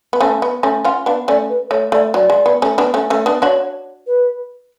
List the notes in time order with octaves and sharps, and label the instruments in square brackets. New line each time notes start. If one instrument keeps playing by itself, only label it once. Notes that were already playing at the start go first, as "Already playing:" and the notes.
[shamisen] B3
[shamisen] A3 C#4 [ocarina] A5
[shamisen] B3
A3 C#4
[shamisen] C#4 F4 [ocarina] F#5
[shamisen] B3 D4 [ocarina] F5
[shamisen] A3 C#4 [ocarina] D5
[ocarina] B4
[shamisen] A3 [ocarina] C#5
[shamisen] A3 [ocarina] D5
[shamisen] F#3 [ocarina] D5
[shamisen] G#3
B3
A3 C#4
B3 D4
A3 C#4
A3 C#4
B3 D4
[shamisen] D4 F#4 [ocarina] C#5
[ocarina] B4